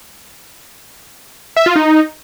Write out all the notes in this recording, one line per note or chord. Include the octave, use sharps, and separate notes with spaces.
E5
F4
D#4